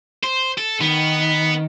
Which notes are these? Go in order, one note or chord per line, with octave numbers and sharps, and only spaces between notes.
C5
A4
D#3 B3